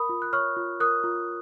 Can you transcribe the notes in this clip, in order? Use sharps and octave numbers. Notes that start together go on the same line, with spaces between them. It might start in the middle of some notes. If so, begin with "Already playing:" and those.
Already playing: A#4 B5 D#6
F4
F#6
C#5 C#6 F6
F4
A#4 D#6 F#6
F4